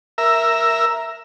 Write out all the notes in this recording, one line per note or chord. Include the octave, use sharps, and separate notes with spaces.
A#4 E5